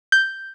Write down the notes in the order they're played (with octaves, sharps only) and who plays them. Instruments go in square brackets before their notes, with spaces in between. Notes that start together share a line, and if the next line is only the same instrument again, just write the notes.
[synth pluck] G6